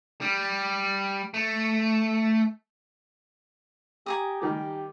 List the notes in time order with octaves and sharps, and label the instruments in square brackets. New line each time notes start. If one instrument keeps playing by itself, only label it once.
[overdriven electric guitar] G3
A3
[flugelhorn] G4 [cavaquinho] G#5 A#5 D#6
[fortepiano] D#3 G3 [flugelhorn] G4